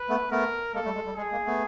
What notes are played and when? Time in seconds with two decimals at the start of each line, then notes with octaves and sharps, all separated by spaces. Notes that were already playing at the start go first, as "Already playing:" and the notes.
Already playing: B4
0.09 A3 B3
0.31 A3 B3 A#4
0.74 G#3 A#3 A4
0.84 G3 A3
0.95 G#3
1.06 G3
1.17 G#3 G#4
1.32 G#3 A#3
1.46 A3 B3